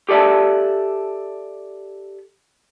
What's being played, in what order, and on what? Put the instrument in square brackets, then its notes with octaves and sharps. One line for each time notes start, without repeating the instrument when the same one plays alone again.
[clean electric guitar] G4 A4 D5 E5 A5